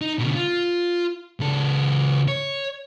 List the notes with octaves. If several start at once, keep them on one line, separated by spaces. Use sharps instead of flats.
D#4
B2 D3
F4
C#2 A4
C#5